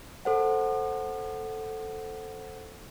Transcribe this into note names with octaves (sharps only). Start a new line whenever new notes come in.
A4 C5 F#5